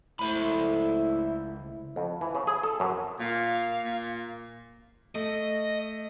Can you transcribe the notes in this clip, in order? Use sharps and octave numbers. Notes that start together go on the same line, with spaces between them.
C#2 A3 E4 C5 B5
F2
E3
C#3
G#4
A4
F#2
A#2 F5
A#2
A3 D#5